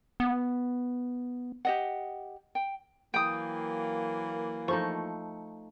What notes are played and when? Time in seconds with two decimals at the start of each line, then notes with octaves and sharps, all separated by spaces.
0.20 B3
1.65 G4 D#5 F#5
2.55 G5
3.14 E3 F#3 A#3 G5 D#6
4.68 F3 A3 D#4 C#6